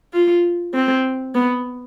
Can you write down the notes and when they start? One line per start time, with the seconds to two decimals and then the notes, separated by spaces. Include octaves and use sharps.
0.13 F4
0.74 C4
1.35 B3